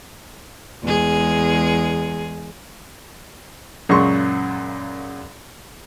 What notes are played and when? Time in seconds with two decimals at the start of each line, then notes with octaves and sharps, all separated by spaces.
0.83 E2 G#3 G#4
3.89 F#2 A#2 C#3 G#3 C6 C#6